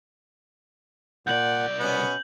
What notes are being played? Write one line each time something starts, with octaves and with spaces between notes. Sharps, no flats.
C2 A#2 D5 F#5 G6 F#7
B2 B3 C#4